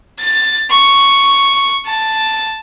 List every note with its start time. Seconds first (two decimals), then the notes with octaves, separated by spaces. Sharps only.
0.19 A6
0.70 C#6
1.86 A5